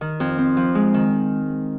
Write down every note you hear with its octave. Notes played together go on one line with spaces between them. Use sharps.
D#3
F2
C4
F3
G#3
D#3